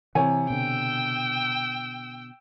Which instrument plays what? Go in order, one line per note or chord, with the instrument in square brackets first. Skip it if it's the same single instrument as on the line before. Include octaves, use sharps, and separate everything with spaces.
[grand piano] C3 [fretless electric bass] E3 [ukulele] C#5 G#5
[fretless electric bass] B2 D3 [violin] G5 E6